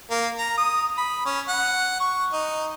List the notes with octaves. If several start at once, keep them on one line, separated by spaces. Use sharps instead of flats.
A#3
A#5
D#6
B5
C#4
F#5
C#6
D#4